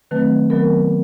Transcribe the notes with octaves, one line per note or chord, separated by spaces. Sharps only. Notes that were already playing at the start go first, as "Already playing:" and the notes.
D#3 F#3 A3 C4 B4
D#3 F#3 B3 A#4